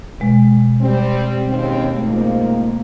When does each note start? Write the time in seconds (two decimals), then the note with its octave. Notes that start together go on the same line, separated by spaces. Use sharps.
0.20 B2 G#3
0.81 G3 C4
1.48 D#2 C#3 C4
1.97 F2 G#2 A3 A#3